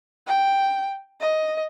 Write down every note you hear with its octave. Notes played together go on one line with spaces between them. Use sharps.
G5
D#5